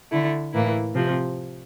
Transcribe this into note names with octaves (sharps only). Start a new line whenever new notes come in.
D3 A3 E4
A2 E3 A#3 E4
C3 F3 C4